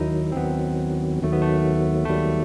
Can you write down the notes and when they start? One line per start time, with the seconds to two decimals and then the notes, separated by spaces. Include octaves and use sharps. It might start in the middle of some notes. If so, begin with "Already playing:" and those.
Already playing: D#2 D#3 F#3 D#4 E4
0.32 C4
0.36 D#2 D#3 F#3 B3
1.23 D#2 D#3 F#3 A3
1.32 B3
1.42 A3
2.05 A3
2.09 D#2 D#3 F#3 G3